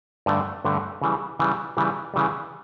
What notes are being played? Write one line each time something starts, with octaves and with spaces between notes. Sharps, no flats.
G2 D3 A3
G2 D3 A3
C#3 E3 G3
C#3 E3 G3
C#3 E3 G3
C#3 E3 G3